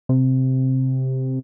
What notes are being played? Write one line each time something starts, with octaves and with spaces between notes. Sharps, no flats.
C3